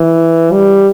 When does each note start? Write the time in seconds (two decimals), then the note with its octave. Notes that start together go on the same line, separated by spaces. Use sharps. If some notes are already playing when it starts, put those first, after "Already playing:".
Already playing: E3
0.53 G3